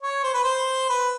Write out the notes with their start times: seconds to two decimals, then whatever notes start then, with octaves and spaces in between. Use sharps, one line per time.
0.02 C#5
0.24 C5
0.34 B4
0.44 C5
0.90 B4